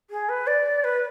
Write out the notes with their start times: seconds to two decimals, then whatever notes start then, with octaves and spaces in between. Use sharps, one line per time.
0.10 G#4
0.29 B4
0.47 D5
0.84 B4